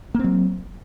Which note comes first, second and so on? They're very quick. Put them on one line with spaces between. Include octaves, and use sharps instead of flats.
A#3 C4 F#3